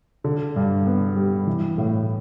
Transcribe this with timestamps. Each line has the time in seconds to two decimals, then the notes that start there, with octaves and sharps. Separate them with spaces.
0.24 D3
0.56 G2
0.86 B3
1.16 G3
1.47 E3
1.78 A2